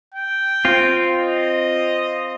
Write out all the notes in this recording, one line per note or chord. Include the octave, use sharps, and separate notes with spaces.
G5
C4 F4
D#5